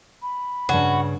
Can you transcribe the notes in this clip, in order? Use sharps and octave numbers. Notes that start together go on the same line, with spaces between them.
B5
G2 C#3 F#4